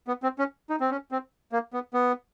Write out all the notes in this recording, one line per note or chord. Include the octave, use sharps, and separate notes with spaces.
B3
C4
C#4
D#4
C4
C#4
C4
A#3
B3
B3